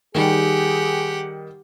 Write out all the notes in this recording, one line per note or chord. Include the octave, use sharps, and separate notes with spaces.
D#3 G3 G4 G#4 F#5